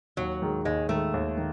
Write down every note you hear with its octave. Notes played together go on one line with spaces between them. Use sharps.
D#2 F#3
D#3 G#3
D#2 G#3
D#3 G#3 A3
D#2
D#3